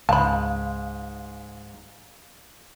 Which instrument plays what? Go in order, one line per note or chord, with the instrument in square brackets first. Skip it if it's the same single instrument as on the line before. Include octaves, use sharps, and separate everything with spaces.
[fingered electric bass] C#2 [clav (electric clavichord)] G#2 G#3 [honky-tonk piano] F5 [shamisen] A5 B5